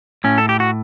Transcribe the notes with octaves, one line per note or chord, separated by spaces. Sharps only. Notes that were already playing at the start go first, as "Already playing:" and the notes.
A2 C#4
A4
G4
F#4